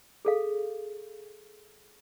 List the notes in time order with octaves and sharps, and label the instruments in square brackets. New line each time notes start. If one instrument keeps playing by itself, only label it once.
[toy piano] G#4 A4 F5